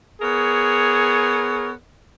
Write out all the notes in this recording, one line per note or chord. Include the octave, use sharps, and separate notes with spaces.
B3 G#4 A#4 C#5